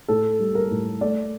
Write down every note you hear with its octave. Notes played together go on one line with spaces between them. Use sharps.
A2 A4
G3
A#4
A2
A3 D5